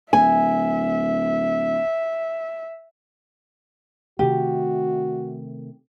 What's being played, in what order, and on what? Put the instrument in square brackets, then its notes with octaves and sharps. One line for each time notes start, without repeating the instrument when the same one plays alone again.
[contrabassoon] D1 [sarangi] E5 [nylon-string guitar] G#5
[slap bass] C3 D#3 A3 [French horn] F#4 [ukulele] G4